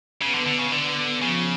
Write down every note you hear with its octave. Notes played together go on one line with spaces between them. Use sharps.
C#3 B3
D3
D3
C#3
D3
C#3 F3